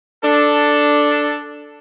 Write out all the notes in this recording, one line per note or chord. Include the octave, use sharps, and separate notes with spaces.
D4 A4